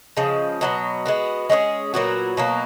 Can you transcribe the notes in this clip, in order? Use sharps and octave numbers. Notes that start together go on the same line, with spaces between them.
C#3 F3 G#3
B2 F#3 B3
G#3 B3 F#4
G#3 C#4 F4 G#4
A#2 F#3 B3 F#4
B2 F#3 A#3